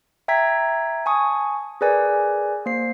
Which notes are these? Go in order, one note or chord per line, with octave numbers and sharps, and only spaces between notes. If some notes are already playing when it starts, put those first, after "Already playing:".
E5 G5 A#5 G#6 B6
G#5 A5 C#6 D#6
G#4 A#4 B4 D5 G#5
A#3 C5 C7